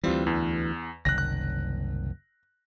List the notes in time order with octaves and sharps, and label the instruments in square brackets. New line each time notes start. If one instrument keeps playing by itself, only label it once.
[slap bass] D2 E3 [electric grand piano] G3 C4 F4
[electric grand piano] E2
[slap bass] F#1 C2 D#3 [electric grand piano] F#6 A#6
[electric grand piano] F#6